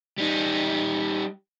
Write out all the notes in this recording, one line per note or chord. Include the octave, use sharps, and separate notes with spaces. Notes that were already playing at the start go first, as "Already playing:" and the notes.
G3 D#4